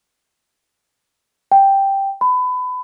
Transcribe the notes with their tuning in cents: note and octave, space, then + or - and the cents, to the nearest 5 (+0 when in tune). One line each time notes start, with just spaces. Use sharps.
G5 +0
B5 +25